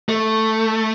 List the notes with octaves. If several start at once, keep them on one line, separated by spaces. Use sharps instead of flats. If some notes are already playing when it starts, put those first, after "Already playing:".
A3